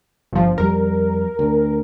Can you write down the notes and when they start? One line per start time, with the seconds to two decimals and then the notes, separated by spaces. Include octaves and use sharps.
0.33 G1 F3
0.58 F2 G3 A#4
1.39 D2